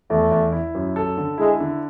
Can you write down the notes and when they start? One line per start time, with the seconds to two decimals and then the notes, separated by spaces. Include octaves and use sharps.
0.10 E2 A3
0.31 E2
0.52 E4
0.75 F#2
0.96 A4
1.17 D3
1.38 G#3 E4
1.60 D3